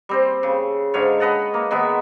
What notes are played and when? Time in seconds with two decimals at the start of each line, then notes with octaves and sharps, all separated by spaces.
0.09 G3 C4 C5
0.43 C#3
0.94 G#2 D3 F4 C#5
1.20 B4 D#5 F#5 A5
1.54 A#3
1.71 D#3 G#3 B3 E5